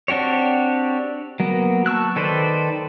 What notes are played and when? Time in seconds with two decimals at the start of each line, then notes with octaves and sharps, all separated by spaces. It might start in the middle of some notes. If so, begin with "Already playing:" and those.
0.08 C4 D4 F#4 G4 C#5
1.40 F#3 A#3 B3
1.86 A5 C#6 E6 F#6
2.16 D#3 A4 B4 C5 D5